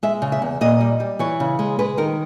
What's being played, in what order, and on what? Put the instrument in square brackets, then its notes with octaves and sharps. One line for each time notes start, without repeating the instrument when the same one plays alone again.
[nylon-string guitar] G#3 E5
C#3
E5
E2
A#2 D#5
G3
G3
E3 C#5
C#3
G#3
G#3 B4
D#3 A#4